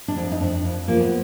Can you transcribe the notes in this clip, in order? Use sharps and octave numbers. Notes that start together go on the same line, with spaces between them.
D4
F2
D#4
F2 D4
F2
F3 A#3
B3